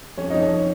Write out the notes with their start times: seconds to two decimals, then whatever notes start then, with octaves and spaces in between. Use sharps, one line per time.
0.18 F2 C#4 C#5
0.30 F2 D#4 D#5
0.42 C#4 C#5
0.51 F3